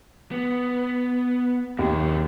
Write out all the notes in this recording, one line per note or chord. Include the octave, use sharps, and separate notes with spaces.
B3
D#2 A#2 G#4